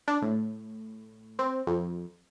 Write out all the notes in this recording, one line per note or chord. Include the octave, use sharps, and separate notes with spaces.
D4
A2
C4
F2